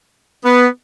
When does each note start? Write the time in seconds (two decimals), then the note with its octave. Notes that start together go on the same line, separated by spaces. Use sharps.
0.44 B3